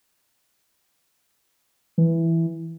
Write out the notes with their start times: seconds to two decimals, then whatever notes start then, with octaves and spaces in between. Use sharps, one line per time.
1.98 E3